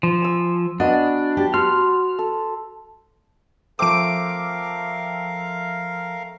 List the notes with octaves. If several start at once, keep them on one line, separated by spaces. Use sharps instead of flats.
F3
G#5 E6
B3 D4 F#4 D#5 F#5
G4 A5
F#4 C6 F6
A4
F3 A3 C4 A#4 F5 D6 E6 D7